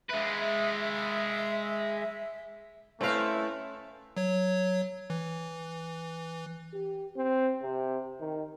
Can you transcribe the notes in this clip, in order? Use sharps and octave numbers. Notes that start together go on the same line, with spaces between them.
G#3 B4 E5
A3 C4 C#4 E4 B4 F5
F#3 C#5
E3
G4
C4
C3
D#3